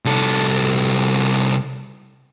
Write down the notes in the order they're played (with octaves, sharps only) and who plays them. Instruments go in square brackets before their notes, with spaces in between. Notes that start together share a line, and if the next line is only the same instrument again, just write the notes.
[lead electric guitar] C2 A4